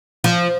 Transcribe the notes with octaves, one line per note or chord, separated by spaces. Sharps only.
F3